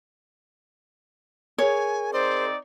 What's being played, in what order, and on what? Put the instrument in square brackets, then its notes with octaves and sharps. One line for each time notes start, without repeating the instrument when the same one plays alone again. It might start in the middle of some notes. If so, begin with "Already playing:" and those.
[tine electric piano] G#4 A#4 [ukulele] C#5 [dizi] G#5
[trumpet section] C4 D#4 D5 [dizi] C5